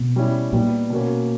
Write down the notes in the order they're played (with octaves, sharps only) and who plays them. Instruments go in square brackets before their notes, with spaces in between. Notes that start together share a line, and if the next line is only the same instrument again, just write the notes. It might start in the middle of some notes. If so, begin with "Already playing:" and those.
Already playing: [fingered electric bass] B2
[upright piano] G3 C#4 E4
[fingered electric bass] A#2 [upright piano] G3 B3 D#4
[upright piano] B2 A#3 C#4